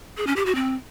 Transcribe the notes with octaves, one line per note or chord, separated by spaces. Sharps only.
G#4
C#4
G4
F#4
C4